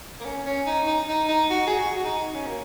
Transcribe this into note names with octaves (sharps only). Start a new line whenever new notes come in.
A#3
C#4
C#4
D#4
D#4
D#4
D#4
F#4
G#4
F#4
F#4
D#4
C#4
A#3